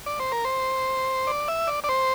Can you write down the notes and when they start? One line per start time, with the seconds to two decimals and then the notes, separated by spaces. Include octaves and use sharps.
0.06 D5
0.20 C5
0.32 A#4
0.45 C5
1.27 D5
1.48 E5
1.67 D5
1.84 D5
1.89 C5